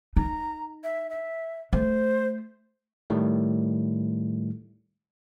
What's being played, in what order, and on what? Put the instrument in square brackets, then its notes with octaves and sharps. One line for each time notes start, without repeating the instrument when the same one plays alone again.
[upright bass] D#4 [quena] A#5
[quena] E5
E5
[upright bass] A3 [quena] C5
[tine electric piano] A2 D#3 G3 A3